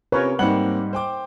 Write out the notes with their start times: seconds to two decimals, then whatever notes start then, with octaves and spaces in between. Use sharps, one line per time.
0.12 C3 C#4 F4 A#4 B4 C#5
0.39 G#2 G3 A#3 C4 F#5 F#7
0.93 C5 G5 D6